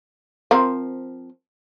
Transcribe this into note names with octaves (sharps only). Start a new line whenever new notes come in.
F3 C4 A#4